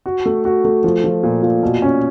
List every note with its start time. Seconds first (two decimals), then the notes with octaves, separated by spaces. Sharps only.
0.06 F#4
0.25 A3
0.45 F#4
0.65 A3
0.84 F3
1.04 F3
1.23 A#2
1.43 A#2
1.63 B2
1.82 C#4